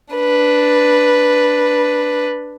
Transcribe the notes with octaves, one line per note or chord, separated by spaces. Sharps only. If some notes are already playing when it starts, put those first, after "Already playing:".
D4 B4